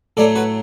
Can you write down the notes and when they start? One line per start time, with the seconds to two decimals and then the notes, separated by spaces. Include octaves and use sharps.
0.17 A2 F#3 A3 A4 D5
0.36 F#4 B4